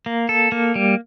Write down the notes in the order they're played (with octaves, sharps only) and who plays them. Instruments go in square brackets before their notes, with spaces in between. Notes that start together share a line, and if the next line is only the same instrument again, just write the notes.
[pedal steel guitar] A#3
A4
A#3
G3